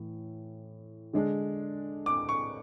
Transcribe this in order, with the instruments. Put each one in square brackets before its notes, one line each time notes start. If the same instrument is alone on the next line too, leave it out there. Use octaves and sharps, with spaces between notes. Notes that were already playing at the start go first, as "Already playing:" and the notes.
Already playing: [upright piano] A2 E3
D3 G#3 D4
[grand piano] D6
C#6